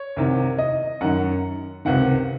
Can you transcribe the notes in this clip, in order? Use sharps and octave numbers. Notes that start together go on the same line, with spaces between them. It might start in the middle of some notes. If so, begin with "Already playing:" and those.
Already playing: C#5
C2 C3 D#3
D#5
F#2 D#3 F#5
C#2 C3 D#3 F#5